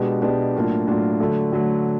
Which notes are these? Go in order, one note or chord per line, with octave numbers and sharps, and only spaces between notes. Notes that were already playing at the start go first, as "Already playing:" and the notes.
Already playing: B2 G#3 B3 D4 G4
B2 G#3 B3 D4 G4
A2 F#3 A#3 D4 F4
A2 F#3 A#3 D4 F4
D3 F#3 A3
D3 F#3 A3